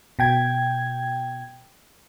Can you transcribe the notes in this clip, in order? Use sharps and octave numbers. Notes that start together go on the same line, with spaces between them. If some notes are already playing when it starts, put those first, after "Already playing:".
B2 G5 G#6